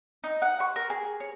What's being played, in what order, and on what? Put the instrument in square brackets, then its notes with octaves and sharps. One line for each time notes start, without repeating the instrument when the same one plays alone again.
[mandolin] D#4
F#5
C#6
A#4
G#4
C#5